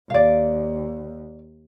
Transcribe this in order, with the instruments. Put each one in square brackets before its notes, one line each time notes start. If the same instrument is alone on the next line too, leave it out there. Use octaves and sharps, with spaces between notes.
[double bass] D#2 [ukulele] D5 F5